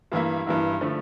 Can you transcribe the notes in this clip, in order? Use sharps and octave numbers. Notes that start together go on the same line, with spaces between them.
G2 E3 A#3 E4
G2 E3 A#3 E4
D3 F3 A3